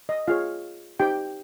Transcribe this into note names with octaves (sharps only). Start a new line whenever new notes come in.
D#5
F4 G#4 C#5 F5
D#4 G4 C5 G5